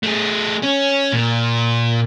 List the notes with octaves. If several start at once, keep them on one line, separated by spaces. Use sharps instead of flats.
A3 G#4
C#4
A#2